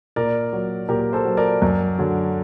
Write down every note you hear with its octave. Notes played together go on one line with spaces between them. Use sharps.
A#2 A#4 D5
F#3
A#2 G4 A#4
A4 C5
F#3
A#4 D5
F#2
D3 F#3